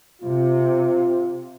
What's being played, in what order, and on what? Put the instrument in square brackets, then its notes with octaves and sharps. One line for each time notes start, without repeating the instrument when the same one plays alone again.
[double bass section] C3 [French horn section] F4